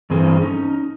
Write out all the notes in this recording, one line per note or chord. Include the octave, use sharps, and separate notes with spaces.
G2 E3 C4 G#4 A4 C5
C#4 D#4